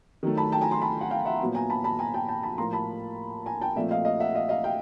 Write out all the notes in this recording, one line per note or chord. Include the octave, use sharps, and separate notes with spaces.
D#3 F#3 A3
A5 B5
G5 A5
G#5 A#5
A#5 C6
A5 B5
F#5 G#5
F5 G5
E5 F#5
A#2 F#3 B3
G#5 A#5
A5 B5
A5 B5
G#5 A#5
G5 A5
G5 A5
A5 B5
A2 F3 A#3 A#5 C6
A5 B5
G#5 A#5
G5 A5
A#2 F3 A3 C4 D5 E5
D#5 F5
D#5 F5
E5 F#5
D#5 F5
D#5 F5
F5 G5